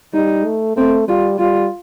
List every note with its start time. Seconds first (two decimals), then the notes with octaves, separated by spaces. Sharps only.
0.14 G3 D#4
0.45 A3
0.76 A3 C4
1.08 G3 F4
1.39 G3 F4